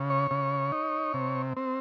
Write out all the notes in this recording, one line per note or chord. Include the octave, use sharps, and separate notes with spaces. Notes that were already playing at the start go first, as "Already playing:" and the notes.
Already playing: C#3
C#5
C#3
D#4
C3
C4